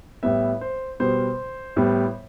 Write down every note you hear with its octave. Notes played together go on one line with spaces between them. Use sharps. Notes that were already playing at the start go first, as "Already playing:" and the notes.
A2 G3 B3 E5
C5
B2 G3 B3 C5
A2 G3 B3